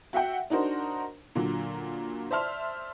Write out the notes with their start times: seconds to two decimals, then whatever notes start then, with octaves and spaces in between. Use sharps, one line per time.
0.13 F#4 E5 F#5 G5
0.50 D4 D#4 F#4 A#4 C5
1.35 A#2 D3 F#3
2.31 C5 D5 E5 A5 C6 F6